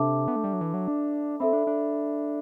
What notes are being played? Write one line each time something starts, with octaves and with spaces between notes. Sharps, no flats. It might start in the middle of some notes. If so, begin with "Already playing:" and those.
Already playing: C3 D4 A4 E5 A5 D6
B3
A3
G3
F#3
E3
F#3
D4
C4 A4 E5 B5
D4
D4